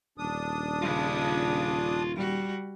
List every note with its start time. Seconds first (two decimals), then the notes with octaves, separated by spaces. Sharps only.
0.18 D#1 D4 D#6
0.82 C#3 F4 B5
2.15 G3 F#4